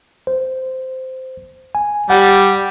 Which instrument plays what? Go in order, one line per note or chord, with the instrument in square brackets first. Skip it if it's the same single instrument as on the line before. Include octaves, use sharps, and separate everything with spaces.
[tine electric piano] C5
G#5
[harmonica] G3 [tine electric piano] F#5